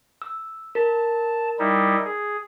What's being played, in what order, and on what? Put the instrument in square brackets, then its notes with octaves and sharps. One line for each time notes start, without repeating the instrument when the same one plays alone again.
[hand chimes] E6
[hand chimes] A#4 [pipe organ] A5
[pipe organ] G3 D#4 E4
G#4